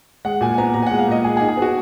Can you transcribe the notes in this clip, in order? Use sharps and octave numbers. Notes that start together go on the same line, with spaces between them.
G#3 F#5
A#2 G#5
G#5
B3 A#5
A#2 A#5
G#5
G#3 F#5
F5
A#2 D#5
G#3 G#4
G#4
D#4
G#4
B3 F#4